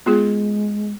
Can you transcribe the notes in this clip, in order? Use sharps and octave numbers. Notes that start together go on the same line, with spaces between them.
G#3 B3 F4 G#4